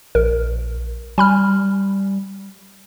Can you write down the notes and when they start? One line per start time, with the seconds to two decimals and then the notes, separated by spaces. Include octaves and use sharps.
0.15 A#1 A#4
1.18 G3 G#5 B5 F6